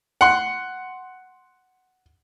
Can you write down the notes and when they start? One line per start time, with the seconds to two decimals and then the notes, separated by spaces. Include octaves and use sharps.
0.21 F#5 C6